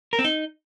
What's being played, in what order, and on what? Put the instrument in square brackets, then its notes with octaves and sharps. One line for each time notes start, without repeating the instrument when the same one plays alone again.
[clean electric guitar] A#4
C4
D#4